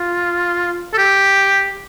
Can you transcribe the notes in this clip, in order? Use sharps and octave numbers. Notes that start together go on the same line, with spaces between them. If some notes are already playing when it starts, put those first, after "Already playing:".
Already playing: F4
A4
G4